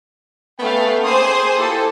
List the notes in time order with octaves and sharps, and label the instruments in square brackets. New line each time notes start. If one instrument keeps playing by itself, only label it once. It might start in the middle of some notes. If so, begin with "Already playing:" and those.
[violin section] A3 F5 [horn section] B3 C#4 G5
[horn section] A#3 G5 C6 [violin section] G#4 C5 D#6
[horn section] E4 F4 G4 [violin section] A4